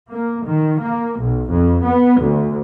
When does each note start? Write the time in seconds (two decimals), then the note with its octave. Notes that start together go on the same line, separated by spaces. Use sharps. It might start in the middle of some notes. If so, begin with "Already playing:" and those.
0.11 A#3
0.46 D#3
0.81 A#3
1.20 B1
1.49 F2
1.85 B3
2.21 D2